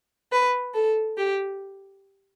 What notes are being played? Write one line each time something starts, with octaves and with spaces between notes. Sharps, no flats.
B4
A4
G4